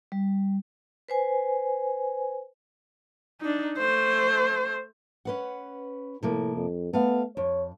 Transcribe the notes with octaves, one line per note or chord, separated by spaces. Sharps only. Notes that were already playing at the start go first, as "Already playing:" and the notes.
G3
B4 C5 G#5
D4 D#4
A3 C5
C#4 B4 F#5
A2 C3 F3 A#3
F2
A3 B3 F5
F2 C#5